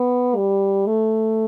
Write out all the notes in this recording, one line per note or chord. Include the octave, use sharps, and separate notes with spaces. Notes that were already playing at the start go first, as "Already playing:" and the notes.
Already playing: B3
G3
A3